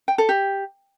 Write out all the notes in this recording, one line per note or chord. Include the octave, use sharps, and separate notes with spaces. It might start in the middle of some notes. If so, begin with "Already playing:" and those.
G5
A4
G4